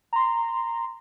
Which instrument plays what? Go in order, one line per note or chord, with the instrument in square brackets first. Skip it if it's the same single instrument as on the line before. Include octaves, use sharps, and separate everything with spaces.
[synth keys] A#5 C6